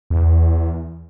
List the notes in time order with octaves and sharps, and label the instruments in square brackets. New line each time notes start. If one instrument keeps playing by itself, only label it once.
[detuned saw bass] E2